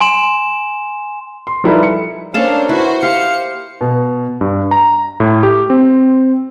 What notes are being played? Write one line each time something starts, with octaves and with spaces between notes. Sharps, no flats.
G#5 C6 E7
C6
F3 G3 D#4 E4 A4 B4
C#7
A#3 C#4 D4 A4 C5 F5 A5
E4 F#4 B4 C5
G4 C5 F5 C#7
B2
G2
A#5
A2
G4
C4